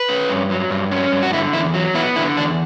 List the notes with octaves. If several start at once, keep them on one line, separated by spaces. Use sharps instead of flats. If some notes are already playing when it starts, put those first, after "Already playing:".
Already playing: B4
C#4
G2
F#3
G2
C#4
G2
F#4
D3 E4
E2 E4
F#3
B3 E4
D3 E4
E2 D4